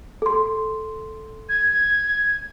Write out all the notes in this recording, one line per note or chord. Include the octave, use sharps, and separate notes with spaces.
A4 C6
G#6